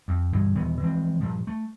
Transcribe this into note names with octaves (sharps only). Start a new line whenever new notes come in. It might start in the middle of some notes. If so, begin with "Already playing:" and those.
F2
G1 G2 B2 E3
D#1 A#2 E3 B3
E3 F3 G#3 C4
G2 A#2 F3
A3